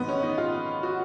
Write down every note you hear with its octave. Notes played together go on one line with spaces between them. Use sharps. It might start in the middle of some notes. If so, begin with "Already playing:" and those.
Already playing: G#2 D#3 F#3 B3 D#4
C#4
D#4
F4
F#4